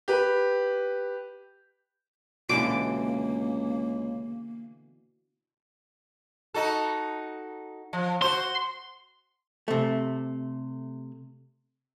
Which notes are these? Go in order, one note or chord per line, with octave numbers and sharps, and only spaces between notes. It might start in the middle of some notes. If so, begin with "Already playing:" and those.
G4 B4
C#2 B2 D3 E3 A#3 D6
D#4 F#4 A4
F3
F#4 C5 C6
C3 A3